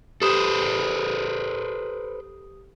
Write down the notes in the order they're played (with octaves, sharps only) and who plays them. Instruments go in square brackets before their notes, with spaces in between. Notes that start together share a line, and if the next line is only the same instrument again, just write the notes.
[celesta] G4 D#6 E7 [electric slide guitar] A4 B4 C5